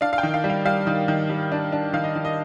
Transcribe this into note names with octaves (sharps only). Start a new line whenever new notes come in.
D4 F5
F5
G5
D#3
F5
G3
F5
G3 F5
D#3
D#3
G3
D4
D4
D#3 F5
D#5
D#3
D#5